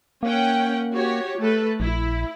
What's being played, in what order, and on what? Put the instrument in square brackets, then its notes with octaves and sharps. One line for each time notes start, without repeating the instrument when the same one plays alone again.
[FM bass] A#3 [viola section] C#4 F#5 G5
[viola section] F#4 G4 C#5
A3 A4 B4
[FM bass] A#1 [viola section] E4